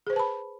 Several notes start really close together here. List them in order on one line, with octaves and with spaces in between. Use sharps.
G#4 C5 B4 A5 B5